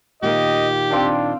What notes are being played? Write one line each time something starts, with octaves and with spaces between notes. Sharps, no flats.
A#2 D#3 A#3 G4 D#5
C4 D4 F5 G5